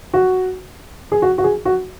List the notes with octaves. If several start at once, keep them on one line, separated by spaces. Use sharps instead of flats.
F#4
G#4
F#4
F#4
G#4
F#4